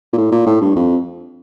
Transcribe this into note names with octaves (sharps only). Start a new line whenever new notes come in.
A#2
A2
A#2
A2
G2
F2